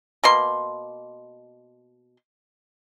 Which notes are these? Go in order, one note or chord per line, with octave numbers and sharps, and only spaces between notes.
B2 A#3 C6